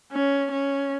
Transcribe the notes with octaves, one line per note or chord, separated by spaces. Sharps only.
C#4
C#4